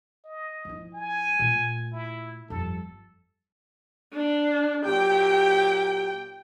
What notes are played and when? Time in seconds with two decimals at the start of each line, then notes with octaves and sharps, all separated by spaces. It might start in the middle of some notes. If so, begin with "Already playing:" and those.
0.25 D#5
0.65 F3 E4
0.94 G#5
1.39 A#2 A3
1.93 E4
2.50 G1 F2 A4
4.13 D4
4.85 A#2 F#3 G4 G5